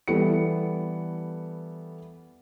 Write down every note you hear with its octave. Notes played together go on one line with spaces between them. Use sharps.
E3 G3 B3 A4 C#7